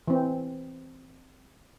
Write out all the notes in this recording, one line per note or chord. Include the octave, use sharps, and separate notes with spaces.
E3 C4